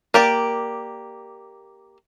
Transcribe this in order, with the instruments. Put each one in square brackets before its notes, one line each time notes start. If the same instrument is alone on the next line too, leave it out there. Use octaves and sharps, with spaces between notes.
[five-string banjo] A#3 G4 D5